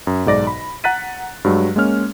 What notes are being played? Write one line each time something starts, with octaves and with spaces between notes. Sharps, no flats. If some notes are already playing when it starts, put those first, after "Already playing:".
F#2
B1 G#2 D5 A#6
B5
F#5 A#5 F#6 A6 B6 D#7
G2 F#3 G#3
G#3 A#3 C#4 F6